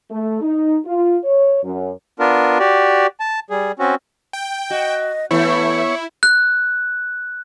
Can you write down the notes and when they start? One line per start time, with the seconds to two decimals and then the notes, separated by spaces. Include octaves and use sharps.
0.10 A3
0.41 D#4
0.86 F4
1.25 C#5
1.64 F#2
2.20 B3 D4 F4 A#4
2.59 F#4 G4 D5
3.20 A5
3.50 G3 G#4
3.79 C4 C#4 F#4
4.33 G5
4.70 F#4 D#5
5.31 E3 A3 B3 E4 C#5
6.23 F#6